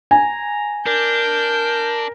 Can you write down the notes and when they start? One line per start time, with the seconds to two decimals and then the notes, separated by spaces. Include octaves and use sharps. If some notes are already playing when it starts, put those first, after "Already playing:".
0.11 G#5 A#5
0.86 D4 A#4 G6